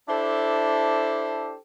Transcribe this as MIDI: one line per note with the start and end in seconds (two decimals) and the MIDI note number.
0.09 1.56 62
0.09 1.56 64
0.09 1.56 67
0.09 1.56 69
0.09 1.56 72